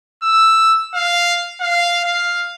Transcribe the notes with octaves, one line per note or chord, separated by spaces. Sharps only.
E6
F5
F5
F5